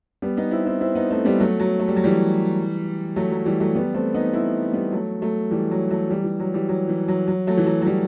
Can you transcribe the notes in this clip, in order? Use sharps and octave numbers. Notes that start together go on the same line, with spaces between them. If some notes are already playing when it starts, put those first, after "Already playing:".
G3 B3
B3 D#4
C4 E4
C4 E4
C4 E4
B3 D#4
A3 C4
G3 B3
F#3 A3
F#3
A3
G3
F#3
E3 G3
F#3 A3
F#3
E3 G3
F#3 A3
G3 B3
A3 C4
B3 D#4
C4 E4
G3 B3
F#3 A3
F#3 A3
E3 G3
F#3
F#3 A3
E3 G3
E3
F#3
E3 G3
F#3
E3
F#3
F#3
F#3 A3
E3
F#3
F#3
E3 G3